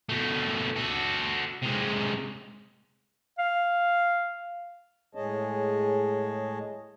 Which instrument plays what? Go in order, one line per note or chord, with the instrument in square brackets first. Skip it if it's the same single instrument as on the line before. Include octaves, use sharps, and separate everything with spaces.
[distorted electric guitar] B2 A3
F#4 A4
C3 G#3
[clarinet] F5
[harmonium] A2 G#3 G#4 C#5 D#5 A5